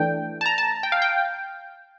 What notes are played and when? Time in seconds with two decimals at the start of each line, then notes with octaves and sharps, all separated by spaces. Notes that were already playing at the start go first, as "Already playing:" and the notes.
Already playing: E3 A3 D4 G5
0.41 A5
0.46 A#5
0.58 A5
0.83 G5
0.92 F5
1.02 G5